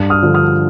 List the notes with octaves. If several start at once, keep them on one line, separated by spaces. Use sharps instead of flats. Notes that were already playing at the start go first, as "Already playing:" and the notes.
Already playing: G2
D#6 F6
D3 F3
D#6 F6